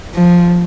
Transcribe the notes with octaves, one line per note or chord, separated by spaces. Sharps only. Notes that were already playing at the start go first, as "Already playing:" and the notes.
F3